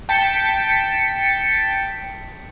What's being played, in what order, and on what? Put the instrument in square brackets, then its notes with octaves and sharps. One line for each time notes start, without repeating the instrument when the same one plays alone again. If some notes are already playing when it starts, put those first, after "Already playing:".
[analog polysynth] G5 A5 B6 C#7